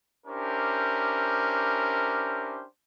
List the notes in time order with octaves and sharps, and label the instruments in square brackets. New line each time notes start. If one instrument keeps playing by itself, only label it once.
[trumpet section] C#4 D4 E4 G4 A#4 C5